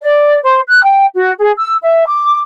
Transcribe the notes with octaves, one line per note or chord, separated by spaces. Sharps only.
D5
C5
F#6
G5
F#4
G#4
E6
E5
D6